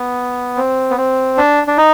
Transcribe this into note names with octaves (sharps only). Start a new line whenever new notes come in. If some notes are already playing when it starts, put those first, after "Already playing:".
Already playing: B3
C4
B3
C4
D4
D4
D#4